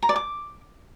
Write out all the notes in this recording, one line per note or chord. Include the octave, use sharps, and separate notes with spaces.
A#5
D5
D6